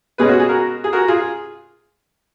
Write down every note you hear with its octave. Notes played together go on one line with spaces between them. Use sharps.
B2 G#3 C#4 G#4 B4
F#4
G#4
F#4 A#4
G#4
F#4 A#4
F4 G#4